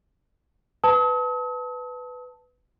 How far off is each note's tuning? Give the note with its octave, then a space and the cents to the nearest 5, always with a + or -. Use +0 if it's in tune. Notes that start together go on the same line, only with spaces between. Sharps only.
B4 +10 A5 +0 D#6 +45